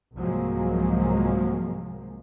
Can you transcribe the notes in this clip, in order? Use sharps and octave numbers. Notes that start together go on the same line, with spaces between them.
C2 G#2 F3 F#3 G#3 A#3